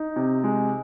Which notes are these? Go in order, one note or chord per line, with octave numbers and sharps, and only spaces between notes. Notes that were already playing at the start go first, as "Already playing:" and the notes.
Already playing: D#4
C3
G#3